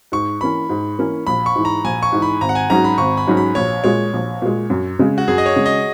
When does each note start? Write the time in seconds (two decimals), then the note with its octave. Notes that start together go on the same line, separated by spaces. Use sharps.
0.12 G#2 C#6
0.41 E3 A#3 C#4 B5
0.69 G#2
0.99 E3 A#3 C#4
1.27 A#1 B5
1.46 C#6
1.55 G#2 E3
1.65 A#5
1.84 A#1 G#5
2.03 C#6
2.12 G#2 E3
2.22 B5
2.41 G#1 A#5
2.49 F#5
2.55 G#5
2.70 G#2 F#3 C#4 F#4 A#5
2.84 B5
2.98 G#1 C#6
3.17 B5
3.27 G#2 F#3 C#4 F#4
3.37 B5
3.55 A#1 C#5
3.84 A#2 G#3 C#5
4.13 A#1
4.42 A#2 G#3
4.70 F#2
4.99 C#3 G#3
5.18 F#4
5.28 F#2 G#4
5.38 D#5
5.46 C#5
5.56 C#3 G#3
5.66 D#5